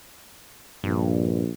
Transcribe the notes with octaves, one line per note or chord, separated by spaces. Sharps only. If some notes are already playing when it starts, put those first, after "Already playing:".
A#1 G2